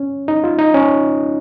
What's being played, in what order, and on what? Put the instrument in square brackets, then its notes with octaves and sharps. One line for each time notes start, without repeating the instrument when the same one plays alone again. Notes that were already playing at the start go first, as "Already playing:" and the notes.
Already playing: [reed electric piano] C#4
D#4
F4
D#4
C#4